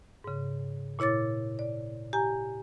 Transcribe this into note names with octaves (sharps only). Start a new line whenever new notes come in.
G#2 C#3
A#2 E4 C#5 D6 A6
D5
G4 G#5 A#5